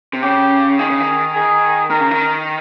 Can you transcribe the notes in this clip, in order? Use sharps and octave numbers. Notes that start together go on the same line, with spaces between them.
C3
C#3 G4
D#3 G#4
C#3
D#3
G#4
D#3 A#4
C#3
D#3